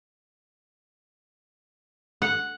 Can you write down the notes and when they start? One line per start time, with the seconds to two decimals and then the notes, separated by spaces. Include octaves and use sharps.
2.22 F#5